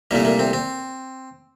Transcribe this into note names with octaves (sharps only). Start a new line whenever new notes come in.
C2 A#2 A3 A#3
A#3
C4
C4